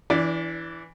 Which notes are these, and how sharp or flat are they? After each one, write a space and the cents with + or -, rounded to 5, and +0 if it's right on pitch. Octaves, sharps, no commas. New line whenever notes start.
E3 +0 D4 -35 D5 +0